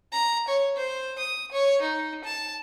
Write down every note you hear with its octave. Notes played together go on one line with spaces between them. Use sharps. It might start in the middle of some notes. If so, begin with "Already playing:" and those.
A#5
C#5
C5
D#6
C#5
D#4
A5